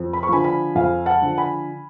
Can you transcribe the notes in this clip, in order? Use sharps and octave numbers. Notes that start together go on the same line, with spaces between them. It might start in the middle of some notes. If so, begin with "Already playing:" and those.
Already playing: F2
B5
C#6
D3 F3 G#5 B5
G#5 B5
F2 F5 G#5
F#5 A5
D3 F3
G#5 B5